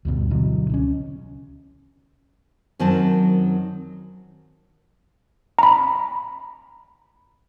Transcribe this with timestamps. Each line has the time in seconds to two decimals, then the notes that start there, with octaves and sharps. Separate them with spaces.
0.05 D2 G2 B2
0.31 B2 D3 E3 F#3
0.69 C#2 A3 C#4
2.80 F#2 D#3 F#3 C4 C5 A5
5.59 A#5 B5